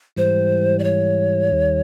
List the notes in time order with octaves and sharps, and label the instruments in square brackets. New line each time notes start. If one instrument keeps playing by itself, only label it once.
[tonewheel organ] G#2 E3 G3 [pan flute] C5
[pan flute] D5
C#5
[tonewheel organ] D#2 D#3 G3